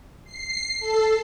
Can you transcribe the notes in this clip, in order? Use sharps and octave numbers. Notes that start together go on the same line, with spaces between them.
C7
A4